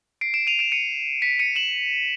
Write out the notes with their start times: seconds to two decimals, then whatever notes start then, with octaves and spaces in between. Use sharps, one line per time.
0.21 C7 D7
0.34 D7 E7
0.47 D#7 F7
0.59 D7 E7
0.72 C#7 D#7
1.22 B6 C#7
1.39 C#7 D#7
1.56 E7 F#7